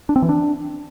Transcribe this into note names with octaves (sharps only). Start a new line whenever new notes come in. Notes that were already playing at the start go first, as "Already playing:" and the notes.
D4
C4
E3
D4